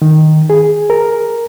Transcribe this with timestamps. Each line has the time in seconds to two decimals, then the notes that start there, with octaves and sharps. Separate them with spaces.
0.02 D#3
0.50 G#4
0.90 A#4